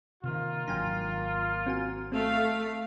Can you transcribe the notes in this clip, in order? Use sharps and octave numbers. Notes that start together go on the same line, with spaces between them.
C3 D#3 A#3 F4
G#1 F#3 D4 G5 G#5 A#5
C4 F#4 G#5
A3 C4 F5